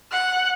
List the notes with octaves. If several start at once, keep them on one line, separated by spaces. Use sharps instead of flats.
F#5